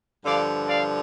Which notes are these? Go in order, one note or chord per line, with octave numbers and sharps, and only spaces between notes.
G2 D3 F3 D5 F5
D5 F5